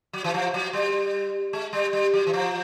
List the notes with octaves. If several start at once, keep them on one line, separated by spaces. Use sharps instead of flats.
F#3
E3
F3
F#3
G3
G#3
G3
G3
F#3
E3
F3